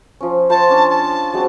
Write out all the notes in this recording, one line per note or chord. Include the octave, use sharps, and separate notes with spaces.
F3 C#4
F4 C5 A5 C6
C#4 D4
A5
F#3 G#3 C4